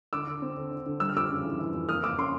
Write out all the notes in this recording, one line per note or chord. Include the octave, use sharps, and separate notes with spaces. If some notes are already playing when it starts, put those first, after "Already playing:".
D3 D6 E6
D3
C4
D3
D3
D3
G3 E6
F6
F2 D6 E6
C#3
E3
E3
F2
A#3 D#6 F6
A#3 D6 E6
C#4 C6 D6